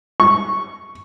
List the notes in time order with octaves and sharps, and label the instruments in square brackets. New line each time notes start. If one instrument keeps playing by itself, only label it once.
[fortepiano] C#6